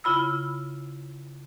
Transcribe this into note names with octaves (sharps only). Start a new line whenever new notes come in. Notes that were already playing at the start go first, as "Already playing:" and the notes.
C#3 E4 F4 B5 E6